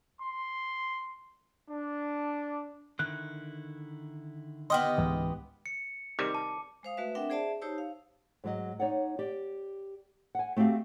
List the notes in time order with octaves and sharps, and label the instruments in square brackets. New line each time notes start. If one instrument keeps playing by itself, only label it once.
[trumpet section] C6
D4
[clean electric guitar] D3 D#3 E4 [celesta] F#6
[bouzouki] B3 G4 D#5 [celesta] C6 D#6 F6
[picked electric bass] C#2 G#2 E3
[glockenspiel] C#7
[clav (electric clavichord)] C3 D#3 G3 [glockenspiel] D6
[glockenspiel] A5
[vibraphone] G#3 C5 F5 D#6
A3 F#4 B4 E5
C4 D4 A#4 E5 F#5 G5
G#4 C5 D5 E5 A5
D#4 G4 C5 C#5 A5 E6
F5
[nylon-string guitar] G#2 F#3 D#5
D#4 C#5 D5 F#5
G4 D5
F#5 G#5
A3 C4 F#4 G4 F5